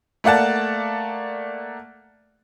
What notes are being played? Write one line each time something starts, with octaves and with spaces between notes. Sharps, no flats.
A3 A#3 D5 F#5 A5